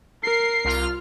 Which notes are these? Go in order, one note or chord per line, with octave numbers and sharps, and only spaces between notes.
A#4 C7
C2 F4 F6